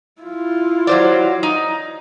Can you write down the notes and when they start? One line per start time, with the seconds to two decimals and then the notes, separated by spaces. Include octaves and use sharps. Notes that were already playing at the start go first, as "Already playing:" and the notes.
0.21 E4 F4
0.87 F#3 C5 D5
1.43 D#4